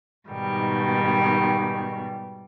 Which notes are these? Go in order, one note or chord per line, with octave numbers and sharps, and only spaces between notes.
G#2 B2 D#3 G3